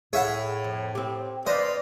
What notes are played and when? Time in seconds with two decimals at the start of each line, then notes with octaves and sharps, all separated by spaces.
0.13 A2 G#4 C#5 E5 F#5
0.64 F2
0.95 C4 G4
1.47 C4 B4 C5 D5 D#5 F5